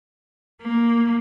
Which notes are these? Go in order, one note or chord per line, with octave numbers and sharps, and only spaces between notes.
A#3